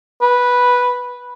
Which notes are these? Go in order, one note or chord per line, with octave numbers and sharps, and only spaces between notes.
B4